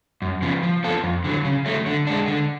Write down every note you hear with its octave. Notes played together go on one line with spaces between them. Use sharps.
F#2
C#3 F3 B3
F3
B3 F4 A4
F2
D3 F#3
C#3
F#3 A3
D3
G#3 D4
D3